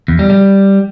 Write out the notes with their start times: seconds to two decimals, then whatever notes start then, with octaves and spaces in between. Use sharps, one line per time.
0.08 E2
0.19 G3
0.30 G3